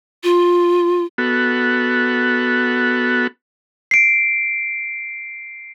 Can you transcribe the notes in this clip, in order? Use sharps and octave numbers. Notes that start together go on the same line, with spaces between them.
F4
B3 F#4 A4
C7 D7